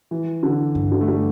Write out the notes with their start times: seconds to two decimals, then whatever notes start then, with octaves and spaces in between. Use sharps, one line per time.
0.11 E3
0.43 D3
0.75 G2
0.92 D3
1.01 A3
1.08 G3